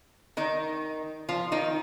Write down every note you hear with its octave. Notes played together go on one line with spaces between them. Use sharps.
D#3 D#4
F3 F4
D#3 D#4